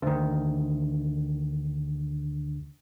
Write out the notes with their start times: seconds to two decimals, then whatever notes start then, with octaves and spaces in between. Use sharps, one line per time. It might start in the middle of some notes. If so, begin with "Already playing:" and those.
0.02 D2 D#3